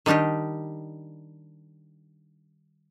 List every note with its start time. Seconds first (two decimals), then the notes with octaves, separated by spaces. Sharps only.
0.06 D#3 G3 D4 D#4 G4